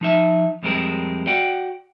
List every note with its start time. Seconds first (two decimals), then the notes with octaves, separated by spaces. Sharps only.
0.01 F3 D#4 E5
0.63 F2 G3 G#3 C4 A#4
1.27 F#4 D5 F#5 G5